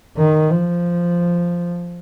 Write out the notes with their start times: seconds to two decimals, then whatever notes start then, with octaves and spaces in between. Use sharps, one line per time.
0.17 D#3
0.50 F3